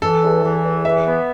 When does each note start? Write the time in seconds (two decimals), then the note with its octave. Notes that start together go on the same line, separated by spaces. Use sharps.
0.02 E3 A4
0.23 E2
0.43 E3
0.64 E2
0.85 E3 E5
1.06 B3